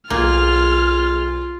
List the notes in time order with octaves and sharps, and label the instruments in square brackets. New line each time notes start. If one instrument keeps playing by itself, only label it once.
[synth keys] B1 G#4 G#6 [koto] A#3 [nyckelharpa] F4 [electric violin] F6